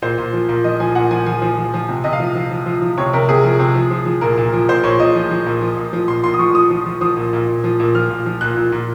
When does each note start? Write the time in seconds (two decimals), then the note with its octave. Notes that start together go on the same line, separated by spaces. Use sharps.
0.02 A#2 C5
0.18 A#2
0.33 F3
0.49 A#2
0.64 F3 D#5
0.80 F3 G#5
0.95 A#2 F#5
1.11 F3 G#5
1.26 F3 G#5
1.42 F3
1.58 F3
1.74 F3
1.89 C3
2.04 C3 D#5
2.13 F5
2.20 F3
2.35 F3
2.51 F3
2.66 F3
2.82 F3
2.98 C3 C#5
3.13 C3 A#4
3.29 C3 G#4
3.44 F3
3.60 C3
3.75 F3
3.91 F3
4.06 F3
4.21 A#2 A#4
4.38 A#2
4.53 F3
4.68 A#2 C5
4.84 A#2 C#5
4.99 A#2 D#5
5.15 F3
5.31 F3
5.46 A#2
5.61 F3
5.77 A#2
5.93 F3
6.08 A#2 C6
6.24 A#2 C6
6.34 D#6
6.39 F3 C#6
6.54 F3 D#6
6.70 F3
6.86 F3
7.01 F3 D#6
7.17 A#2
7.33 A#2
7.48 A#2
7.64 F3
7.80 A#2
7.95 F3 F6
8.10 A#2
8.26 F3
8.41 A#2 F#6
8.57 A#2
8.72 A#2